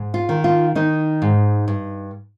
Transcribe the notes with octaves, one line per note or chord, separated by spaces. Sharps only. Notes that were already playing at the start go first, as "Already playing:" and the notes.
Already playing: G#2
F4
D#3
F4
D#3 D#4
G#2
G2